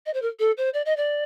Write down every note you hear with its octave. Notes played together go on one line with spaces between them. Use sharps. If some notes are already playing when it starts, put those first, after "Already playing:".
D#5
C5
A#4
A4
C5
D5
D#5
D5